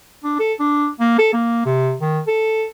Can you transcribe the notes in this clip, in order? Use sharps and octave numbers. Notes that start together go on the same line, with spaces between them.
D4
A4
D4
A#3
A4
A#3
C3
D#3
A4